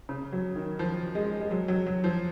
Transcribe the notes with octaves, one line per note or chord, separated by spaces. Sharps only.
C#3
F#3
D#3
F3
G#3
G#3
F#3
F#3
F#3
F3